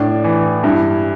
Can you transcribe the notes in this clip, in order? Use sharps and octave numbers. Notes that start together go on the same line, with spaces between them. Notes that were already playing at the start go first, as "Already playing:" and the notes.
Already playing: A2 D4
E3
G2 E4